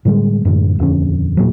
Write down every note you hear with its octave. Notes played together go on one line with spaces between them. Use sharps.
A2 D3 G3 G#3
F#2 A2 D3 G#3
D#1 F2 D3 C#4
E1 A#2 F#3